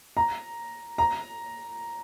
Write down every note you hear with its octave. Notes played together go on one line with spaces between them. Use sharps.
A#5
A#5